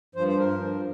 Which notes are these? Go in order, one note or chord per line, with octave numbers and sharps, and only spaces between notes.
G2 F3 C5
C5
A#4
G2 F3